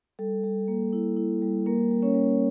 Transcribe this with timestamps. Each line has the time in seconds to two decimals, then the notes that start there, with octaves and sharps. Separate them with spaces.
0.19 G3 A4
0.44 G3
0.68 A#3
0.93 E4
1.16 E4
1.42 G3
1.66 A#3 A#4
1.91 G3
2.02 C#4 C#5
2.14 G3